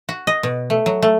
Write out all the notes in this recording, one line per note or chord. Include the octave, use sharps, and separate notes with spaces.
F#4
D#5
B2
A3
F#3
A3